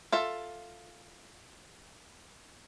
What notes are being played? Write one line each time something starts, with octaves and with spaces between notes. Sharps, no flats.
F4 A4 E5